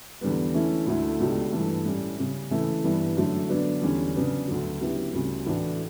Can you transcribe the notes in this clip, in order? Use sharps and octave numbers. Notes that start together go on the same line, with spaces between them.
E2 D3 G3 B3
E3 A3 C#4 E4
D2 D3 A3 E4
C#2 B2 A3 D4 G4
G2 E3 A3
A2 G3 C#4 G4
C#3 G3 C#4
C#3 E3 A3 E4
G2 E3 G3 B3 E4
F#2 D3 F#3 A3
D3 F#3 B3 D4
E2 D3 G3 C#4
C#3 F#3 B3 D4
D2 D3 F#3
C#3 F#3 B3 E4 G4
D2 C#3 G3
A2 E3 A3 D4 F#4